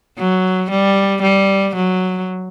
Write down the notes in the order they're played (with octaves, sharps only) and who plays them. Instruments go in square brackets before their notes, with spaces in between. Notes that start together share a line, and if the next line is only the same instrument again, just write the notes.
[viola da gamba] F#3
G3
G3
F#3